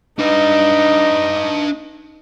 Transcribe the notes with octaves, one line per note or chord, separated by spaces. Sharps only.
D4 D#4 B4